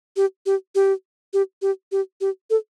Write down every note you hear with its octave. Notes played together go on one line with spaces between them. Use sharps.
G4
G4
G4
G4
G4
G4
G4
A4